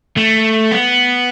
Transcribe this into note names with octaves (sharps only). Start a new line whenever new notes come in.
A3
B3